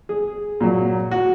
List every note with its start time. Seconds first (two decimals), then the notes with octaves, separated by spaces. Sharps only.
0.09 G#4
0.61 A#2 F#3
1.11 F#4